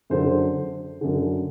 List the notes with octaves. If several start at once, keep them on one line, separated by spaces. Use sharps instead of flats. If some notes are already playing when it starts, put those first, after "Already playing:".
F#2 D3 C5
F#2 D3